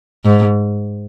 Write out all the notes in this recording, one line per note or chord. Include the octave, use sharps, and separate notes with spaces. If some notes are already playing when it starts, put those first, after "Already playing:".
G#2